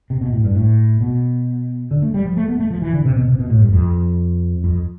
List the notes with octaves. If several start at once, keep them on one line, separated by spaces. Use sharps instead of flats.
C3
B2
A2
G2
A2
B2
D3
A3
G3
F3
A3
B3
A3
F3
E3
D3
C3
B2
C3
B2
A2
G2
F2
F2